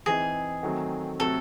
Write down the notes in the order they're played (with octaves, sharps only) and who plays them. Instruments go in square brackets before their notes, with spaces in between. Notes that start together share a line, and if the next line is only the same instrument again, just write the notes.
[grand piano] E3 C4 D#4 [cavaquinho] G#4
[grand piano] D#3 F#3 A3 C4
[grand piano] C3 F#3 A3 C4 F#4 [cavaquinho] A4